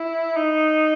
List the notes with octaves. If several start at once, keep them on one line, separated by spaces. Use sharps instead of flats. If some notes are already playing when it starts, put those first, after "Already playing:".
Already playing: E4
D#4